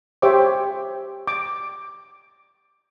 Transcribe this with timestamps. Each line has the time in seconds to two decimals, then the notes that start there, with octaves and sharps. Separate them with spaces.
0.22 G4 C5 C#5 E5 G5 D6
1.27 D6